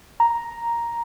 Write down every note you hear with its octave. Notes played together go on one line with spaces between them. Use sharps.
A#5